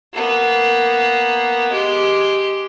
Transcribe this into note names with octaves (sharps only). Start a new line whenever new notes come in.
A#3 B3
G#3 G4